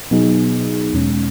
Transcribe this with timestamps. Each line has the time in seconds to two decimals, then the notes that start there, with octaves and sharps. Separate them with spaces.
0.11 B2 F#3 B3 D#4 G#4
0.93 E2 B2 G#3 C#4